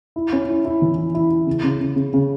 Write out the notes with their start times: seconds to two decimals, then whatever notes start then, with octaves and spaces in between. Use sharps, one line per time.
0.16 E4
0.33 C#4
0.49 E4
0.65 E4
0.82 E3
0.98 E4
1.14 E4
1.30 E4
1.47 C#3
1.63 C#3
1.80 C#3
1.96 C#3
2.14 C#3